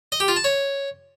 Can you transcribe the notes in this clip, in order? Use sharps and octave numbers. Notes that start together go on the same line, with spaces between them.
D#5
G4
F4
A5
C#5